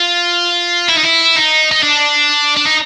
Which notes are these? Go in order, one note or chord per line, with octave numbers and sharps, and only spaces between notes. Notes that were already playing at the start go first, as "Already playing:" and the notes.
Already playing: F4
E4
D#4
E4
D#4
D#4
D4
D4
D#4